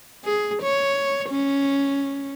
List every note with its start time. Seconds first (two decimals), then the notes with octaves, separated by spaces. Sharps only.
0.24 G#4
0.63 C#5
1.30 C#4